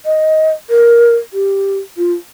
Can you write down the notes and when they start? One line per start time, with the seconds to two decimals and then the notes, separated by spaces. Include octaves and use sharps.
0.06 D#5
0.70 A#4
1.33 G4
1.97 F4